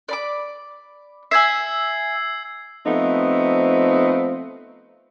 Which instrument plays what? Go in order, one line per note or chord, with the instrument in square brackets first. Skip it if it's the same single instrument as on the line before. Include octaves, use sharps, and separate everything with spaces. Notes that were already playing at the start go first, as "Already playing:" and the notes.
[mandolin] D5 B5 D6
[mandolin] E5 G#5 [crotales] E6 G#6 C7
[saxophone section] F3 A3 B3 C4 D#4